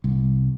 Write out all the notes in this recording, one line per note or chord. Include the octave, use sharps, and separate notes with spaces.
C2